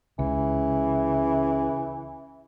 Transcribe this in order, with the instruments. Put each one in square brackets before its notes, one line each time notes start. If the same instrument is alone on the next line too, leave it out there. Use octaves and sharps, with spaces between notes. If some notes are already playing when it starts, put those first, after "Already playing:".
[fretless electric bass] C#2 [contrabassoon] C#3 [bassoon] E3